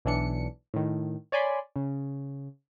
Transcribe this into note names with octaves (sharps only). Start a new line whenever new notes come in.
B1 E3 D4 C#7
A2 D#3
C#5 D5 G#5 B5 C6
C#3